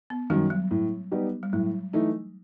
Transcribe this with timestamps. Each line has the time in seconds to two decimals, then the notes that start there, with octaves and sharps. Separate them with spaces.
0.10 B3
0.30 F#2 D#3 G3
0.50 F#3
0.71 A2
1.12 G3 B3 D#4 G4
1.43 G3
1.53 A2 F#3
1.93 E3 A3 D#4